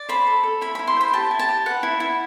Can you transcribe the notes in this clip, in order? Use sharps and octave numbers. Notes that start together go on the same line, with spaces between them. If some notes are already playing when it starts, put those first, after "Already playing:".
Already playing: D5
C5 B5
A4
A4
E4 B5
E4 B5
C6
C5 B5
G4 A5
E4
A5
G4
B4 F#5
E4
E4